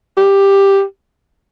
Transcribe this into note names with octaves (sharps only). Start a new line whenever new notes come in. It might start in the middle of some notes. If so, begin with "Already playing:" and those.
G4